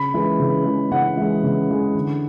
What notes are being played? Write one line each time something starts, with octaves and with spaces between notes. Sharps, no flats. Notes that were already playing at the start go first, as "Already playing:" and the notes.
Already playing: C#3 B5
E3 G#3
C#3
E3 G#3
C#3 F#5
E3 G#3
C#3
E3 G#3
D3